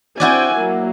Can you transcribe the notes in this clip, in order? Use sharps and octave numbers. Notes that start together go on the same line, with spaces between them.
C4 E4 F#4 D5 G5 G#5
F#3 A#3